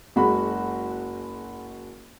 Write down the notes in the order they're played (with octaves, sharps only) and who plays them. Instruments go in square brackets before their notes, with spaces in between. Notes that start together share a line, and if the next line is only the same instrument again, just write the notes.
[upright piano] F#1 G#3 F#4 B5